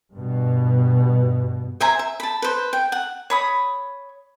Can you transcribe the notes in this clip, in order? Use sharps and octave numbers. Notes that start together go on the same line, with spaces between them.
G2 B2
C5 E5 G#5 A#5
E5
A5 B5
B4 C5
G5
F#5
C#5 B5 D#6